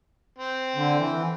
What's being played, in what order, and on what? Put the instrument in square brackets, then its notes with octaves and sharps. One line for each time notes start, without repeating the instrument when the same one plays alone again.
[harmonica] C4
[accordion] D3
E3